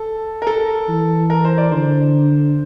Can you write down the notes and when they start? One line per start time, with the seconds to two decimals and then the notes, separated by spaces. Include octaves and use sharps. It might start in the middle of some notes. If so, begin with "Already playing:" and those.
Already playing: A4
0.42 A#4
0.47 A4
0.89 E3
1.30 A#4
1.45 C5
1.58 D5
1.71 D3 C5